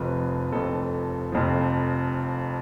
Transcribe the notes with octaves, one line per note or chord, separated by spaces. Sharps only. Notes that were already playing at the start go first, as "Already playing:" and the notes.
Already playing: F1 F2 F3 B4
F1 F2 F3 A4
F1 F2 F3